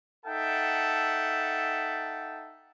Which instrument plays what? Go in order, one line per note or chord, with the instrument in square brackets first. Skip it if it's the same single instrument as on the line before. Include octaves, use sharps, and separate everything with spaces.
[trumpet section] D#4 A4 E5 F#5 G5 A5